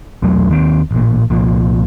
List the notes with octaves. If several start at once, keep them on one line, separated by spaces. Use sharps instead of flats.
B1 E2 F#3 A3
D#2 D#3 F#3 C4
A1 A#2
C2 A#2 F3